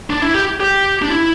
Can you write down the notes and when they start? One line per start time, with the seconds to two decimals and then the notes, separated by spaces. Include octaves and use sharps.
0.10 D4
0.22 E4
0.34 G4
0.60 G4
1.02 D4
1.10 E4